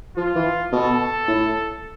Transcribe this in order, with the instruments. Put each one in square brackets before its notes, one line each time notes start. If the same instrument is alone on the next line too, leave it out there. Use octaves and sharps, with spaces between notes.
[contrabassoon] F3 [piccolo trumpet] F4
[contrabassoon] E3
[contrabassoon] B2 [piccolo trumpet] A4
[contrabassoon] A2